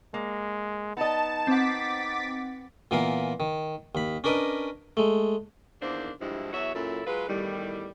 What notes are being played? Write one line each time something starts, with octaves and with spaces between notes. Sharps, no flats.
G#3 A#3
B3 D#4 D#5 A5 E7
C4 F#5 D6 A6 B6
A#2 E3 B3 A#4 F5
D#3
D#2 B5
C#4 D4 A#4 B4 D#5 D6
G#3 A3
E2 D#3 A#3 D4 C5
D2 G2 F3 G#3 E4
E2 F#3 F#4 C#5 E5
F#2 A#2 F#3 E4 F4 A4
F#3 G#3 F4 B4
E2 A2 D#3 G3